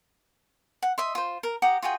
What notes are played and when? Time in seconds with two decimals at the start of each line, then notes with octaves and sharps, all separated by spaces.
0.83 F#5
0.98 D#5 E5 C6
1.15 F4 C5
1.43 A#4
1.62 G4 F#5 A#5 D#6
1.82 F4 F#4 G#4 G5